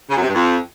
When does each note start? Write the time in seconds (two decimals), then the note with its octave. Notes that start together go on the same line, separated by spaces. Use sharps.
0.10 C#3
0.16 F#2
0.22 C3
0.28 G2
0.34 F2